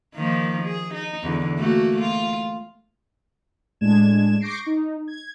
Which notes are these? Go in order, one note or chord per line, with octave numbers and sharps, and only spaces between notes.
D#3 F3 A#3
G#4
D#4
E2 D3
A3 A#3 F#4
F4
A2 G#3 D4 G#6 E7
C#6 D6 G6 A#6 C7 D7
D#4
G#6